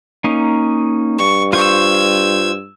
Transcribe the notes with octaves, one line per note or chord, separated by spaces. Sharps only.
A#3 C#4 D#4
G2 C#6
F4 C5 C#6 E6 G#6